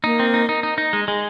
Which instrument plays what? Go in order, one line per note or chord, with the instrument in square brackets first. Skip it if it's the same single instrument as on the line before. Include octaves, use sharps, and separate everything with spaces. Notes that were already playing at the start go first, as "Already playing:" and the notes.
[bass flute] A#3 [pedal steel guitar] D#4
[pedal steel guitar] C4
D#4
D#4
D#4
D#4
G#3
G#3